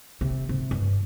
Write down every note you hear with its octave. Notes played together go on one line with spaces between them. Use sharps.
C3
C3
G2